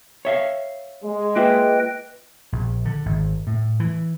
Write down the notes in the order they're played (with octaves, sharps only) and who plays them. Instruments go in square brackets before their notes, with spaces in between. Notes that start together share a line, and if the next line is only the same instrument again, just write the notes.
[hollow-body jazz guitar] C#5 E5 F5
[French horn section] G#3
[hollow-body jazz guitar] A#3 F4 E5 [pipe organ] B4 D#5 G5
[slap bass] A#1
D3
G#1
A2
E3